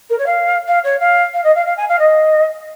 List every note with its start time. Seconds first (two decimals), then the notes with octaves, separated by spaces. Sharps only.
0.10 A#4
0.18 C#5
0.26 F5
0.68 F5
0.84 C#5
1.00 F5
1.34 F5
1.44 D#5
1.55 F5
1.66 F5
1.77 G#5
1.89 F5
1.99 D#5